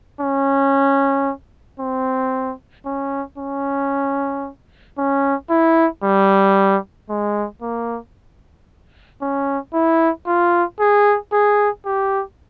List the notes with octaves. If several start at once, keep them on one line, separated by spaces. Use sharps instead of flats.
C#4
C4
C#4
C#4
C#4
E4
G3
G#3
A#3
C#4
E4
F4
G#4
G#4
G4